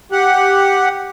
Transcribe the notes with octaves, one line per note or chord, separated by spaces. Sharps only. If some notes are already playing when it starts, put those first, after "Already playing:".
G4 F#5